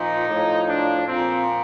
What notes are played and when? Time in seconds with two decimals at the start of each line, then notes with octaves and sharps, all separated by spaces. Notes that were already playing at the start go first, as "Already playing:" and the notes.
Already playing: A#2 F3 D#4
0.28 A2 F3
0.67 D4
1.07 A#2 F3 C4